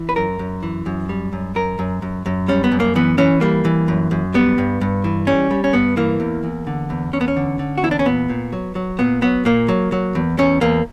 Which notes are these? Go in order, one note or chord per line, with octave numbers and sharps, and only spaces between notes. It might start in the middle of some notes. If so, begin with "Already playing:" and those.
Already playing: E3
B4
F#2 A#4
F#2
E3
F#2
G3
F#2
F#2 A#4
F#2
F#2
F#2
G3 C#4
B3
F#2
A#3
E3 B3
E3 C#4
G3 A#3
E3
F#2
F#2
G3 B3
G2
G2
E3
G3 C#4
G3
C#4
G2 B3
E3 A#3
E2
E2
D3
E2
E2 C#4
B3
C#4
D3
D3
F#4
E2 E4
D4
C#4
A#2 B3
A#2
F#3
F#3
A#2 B3
F#3 B3
A#2 A#3
F#3
F#3
E2
E2 C#4
E2 A#3